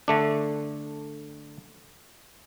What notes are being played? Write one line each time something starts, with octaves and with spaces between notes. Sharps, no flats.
D3 A3 D4